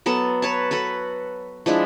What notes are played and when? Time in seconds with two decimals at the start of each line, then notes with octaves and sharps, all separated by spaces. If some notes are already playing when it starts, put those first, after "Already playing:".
0.06 F#3 B3 A4 A5
0.42 B4 C#5 A5
0.71 F#4 A4 B4
1.66 F3 G#3 D4 E4